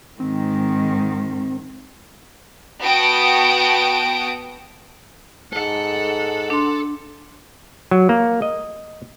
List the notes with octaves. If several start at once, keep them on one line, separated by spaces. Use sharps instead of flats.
G#2 D#3 C4
B3 F#4 G5 A5 D#6 D7
G#2 A4 F#5
D4 C6
F#3
A#3
D#5